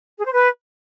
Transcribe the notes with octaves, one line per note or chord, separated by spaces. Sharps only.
G#4
C5
B4